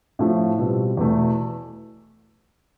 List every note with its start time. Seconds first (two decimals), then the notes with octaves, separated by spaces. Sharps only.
0.19 A2 F3 A3
0.58 B2 G3 C4 F4
0.97 E2 B2 A3